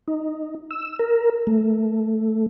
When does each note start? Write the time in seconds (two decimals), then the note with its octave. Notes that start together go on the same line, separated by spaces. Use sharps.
0.08 D#4
0.70 E6
0.99 A#4
1.47 A3